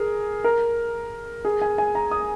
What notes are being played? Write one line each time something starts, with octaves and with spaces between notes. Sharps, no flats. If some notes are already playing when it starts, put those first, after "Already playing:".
Already playing: G#4 A#4
A#4
G#4
G#5
G#5
A#5
D#6